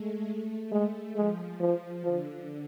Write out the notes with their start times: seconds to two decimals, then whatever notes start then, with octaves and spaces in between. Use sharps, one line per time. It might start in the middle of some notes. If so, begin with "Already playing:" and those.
Already playing: G#3 A3
0.27 A3
0.72 G#3
1.16 F3 G#3
1.60 F3
2.04 D3 F3